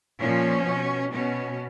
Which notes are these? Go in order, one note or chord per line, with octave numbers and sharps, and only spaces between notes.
A#2 F3 C#4
B2
B2 C#4